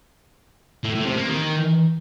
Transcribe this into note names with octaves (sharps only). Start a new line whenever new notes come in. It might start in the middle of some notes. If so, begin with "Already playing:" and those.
A2
A2
C3
A#3
D#3